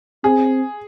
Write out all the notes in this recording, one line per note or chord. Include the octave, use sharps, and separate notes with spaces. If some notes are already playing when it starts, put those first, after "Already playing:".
C4 G#4